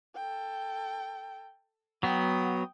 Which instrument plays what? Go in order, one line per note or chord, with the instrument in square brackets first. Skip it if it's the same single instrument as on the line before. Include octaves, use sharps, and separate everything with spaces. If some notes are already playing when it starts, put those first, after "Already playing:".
[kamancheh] A4 G5
[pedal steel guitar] F#3 B3 [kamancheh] G5 D#6